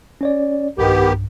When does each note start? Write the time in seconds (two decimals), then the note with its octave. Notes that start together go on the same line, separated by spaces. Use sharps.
0.21 C#4 C#5 D5
0.78 B1 G2 D#3 B3 G4